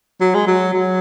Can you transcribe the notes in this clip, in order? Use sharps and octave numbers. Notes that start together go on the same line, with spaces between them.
F#3
G#3
F#3
F#3